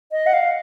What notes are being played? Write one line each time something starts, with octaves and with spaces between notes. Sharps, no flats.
D#5
F#5
F5